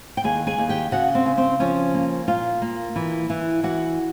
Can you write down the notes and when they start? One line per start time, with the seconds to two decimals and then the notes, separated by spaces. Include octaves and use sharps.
0.17 G5
0.24 D#2 G#4 G#5
0.47 G#4 G#5
0.58 D#2
0.69 G4 G5
0.92 C#3 F#4 F#5
1.15 C4 C5
1.26 C#3
1.37 C4 C5
1.60 F3 C#4 C#5
1.94 A#3
2.28 A#2 F4 F5
2.62 A#3
2.96 E3
3.30 E3
3.63 E3 F#4 F#5